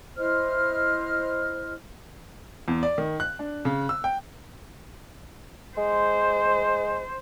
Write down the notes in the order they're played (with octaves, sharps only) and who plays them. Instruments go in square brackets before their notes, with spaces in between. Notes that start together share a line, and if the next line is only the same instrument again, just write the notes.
[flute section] E4 C5 D#5 F6
[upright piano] E2
D5
D#3
F#6
D4
C#3
E6
G5
[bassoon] G#3 [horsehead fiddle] C5